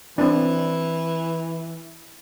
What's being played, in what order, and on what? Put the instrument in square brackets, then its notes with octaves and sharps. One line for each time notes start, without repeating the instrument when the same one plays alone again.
[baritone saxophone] E3 [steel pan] C4 D4